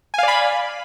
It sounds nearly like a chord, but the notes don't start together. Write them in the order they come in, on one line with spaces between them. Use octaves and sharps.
G#5 F5 D5 B5